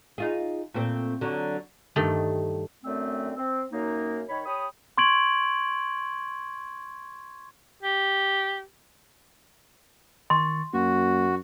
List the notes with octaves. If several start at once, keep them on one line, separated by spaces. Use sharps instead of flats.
D#4 F4 G#4
A#2 A3 C4
D3 F#3
G2 D#3 A3
F#2 D3 A3 C4
C4
F#2 A#3 D#4
D#3 C#5 B5
G4 C#5 B5 D#6
C6 C#6 G#6 D7 F#7
G4
D#3 C6 C#6 A6
F#2 A#3 F#4